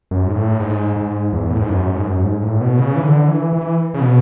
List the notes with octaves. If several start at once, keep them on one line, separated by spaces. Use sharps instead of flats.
F#2
G#2
A2
G#2
G#2
E2
A2
G#2
F#2
G#2
F#2
G#2
A2
B2
C#3
E3
D3
E3
E3
C#3
B2